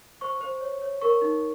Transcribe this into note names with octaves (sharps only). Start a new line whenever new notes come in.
C5 C#6
C5
C#5
C#5
A#4 C#6
D#4